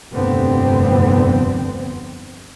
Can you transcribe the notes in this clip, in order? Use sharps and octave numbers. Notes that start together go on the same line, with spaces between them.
F1 D2 G2 D3 B3 C4